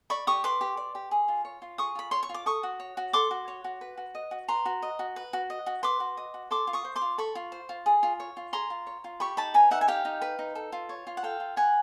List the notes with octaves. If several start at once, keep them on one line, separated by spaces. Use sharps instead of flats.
D5 B5 C#6
G4 C#6 D#6
B4 C6 D6
G4
D5
G4
G#4
F4
C#5
F4
G#4 C#6 D#6
F4 B5
C#5 C6
C#6
F4
D6
A4 C#6 D#6
F#4
C#5
F#4
A4 C6 D6
F#4
C#5
F#4
B4
F#4
D#5
F#4
B4 A#5 C6
F#4
D#5
F#4
B4
F#4
D#5
F#4
B4 C6 D6
F#4
D#5
F#4
A4 C6 D6
F4
C#6 D#6
C5
C6 D6
F4
A4 B5 C#6
F4
C5
F4
G#4
F4
C#5
F4
G#4 A#5 C6
F4
C#5
F4
G4 B5 C#6
D#4 A5 B5
B4 G#5 A#5
D#4 E5 F#5
G#5
G4 F5 G5
D#4
B4
D#4
A4
F4
C#5
F4
F#5
A4 F5 G5
F4
C#5 F#5 G#5